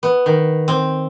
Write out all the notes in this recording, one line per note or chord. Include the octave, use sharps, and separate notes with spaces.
B3
D#3
C4